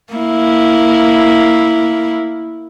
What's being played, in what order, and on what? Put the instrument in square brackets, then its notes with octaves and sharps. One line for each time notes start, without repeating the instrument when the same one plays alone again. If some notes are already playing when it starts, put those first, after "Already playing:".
[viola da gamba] A#3 E4